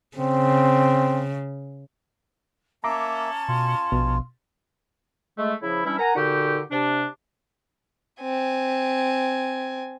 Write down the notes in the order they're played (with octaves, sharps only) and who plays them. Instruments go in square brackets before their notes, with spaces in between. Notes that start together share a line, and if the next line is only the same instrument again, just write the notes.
[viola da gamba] C#3 [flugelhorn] C4
[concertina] A#3 E5 [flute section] C#4 A5 [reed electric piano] A#5 D6
[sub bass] B2 [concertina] F4
[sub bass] A#1 [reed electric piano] B2
[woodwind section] G#3 A3
C#3 F3 E4
E3 G3 C#4 D4 E4
A#4 F#5 G#5 A#5
A#2 D3 D#4 F#4 G4
C3 D4
[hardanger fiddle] C4 G#5